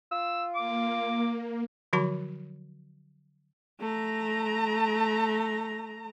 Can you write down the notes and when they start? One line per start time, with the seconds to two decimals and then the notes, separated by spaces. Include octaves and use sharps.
0.12 F4 E6
0.55 A#3 D6
1.93 D3 F3 F#3 F#4 A5 B5
3.81 A3 A#5